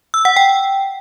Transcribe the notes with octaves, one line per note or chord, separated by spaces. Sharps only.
E6
F#5
G5